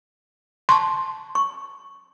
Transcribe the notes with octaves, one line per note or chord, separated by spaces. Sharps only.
A5 C6 C#6
C#6